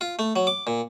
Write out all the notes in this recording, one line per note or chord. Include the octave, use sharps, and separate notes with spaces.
F4
A3
F#3
D6
A#2